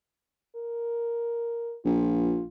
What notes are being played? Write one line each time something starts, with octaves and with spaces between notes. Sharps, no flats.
A#4
A#1 F4